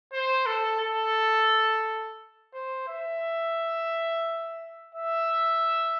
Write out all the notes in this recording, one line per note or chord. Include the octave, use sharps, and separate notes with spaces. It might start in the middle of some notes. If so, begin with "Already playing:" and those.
C5
A4
A4
C5
E5
E5